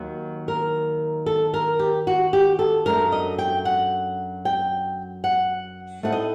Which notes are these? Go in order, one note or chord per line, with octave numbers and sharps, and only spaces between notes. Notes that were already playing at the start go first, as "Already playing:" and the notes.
Already playing: D#2 D#3 F#3
A#4
A4
A#4
G4
F#4
G4
A4
F#2 F#3 A3 D4 A#4
D#5
G5
F#5
G5
F#5
A2 A3 C4 D#4 F#5
D#5